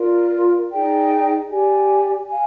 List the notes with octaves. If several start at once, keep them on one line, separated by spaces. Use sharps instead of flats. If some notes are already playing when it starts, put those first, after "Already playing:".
Already playing: F4 A#4 D5
D#4 G#4 D5 G5
G4 D5 G#5
F5 G#5